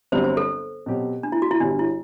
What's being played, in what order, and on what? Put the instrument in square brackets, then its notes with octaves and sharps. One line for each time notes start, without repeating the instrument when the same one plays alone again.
[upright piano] G1 G2 D3 F#3 C4 [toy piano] C5
[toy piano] C5
A4
[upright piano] B2 F#3 C4 G4
[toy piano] D4
E4
F#4
E4
[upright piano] G1 G2 D3 G3 [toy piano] D4
[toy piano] E4